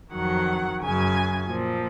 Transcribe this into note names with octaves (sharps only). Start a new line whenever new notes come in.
F2 D#3 F#3 F#5
F#2 C#3 F#3 G#5
A#2 F3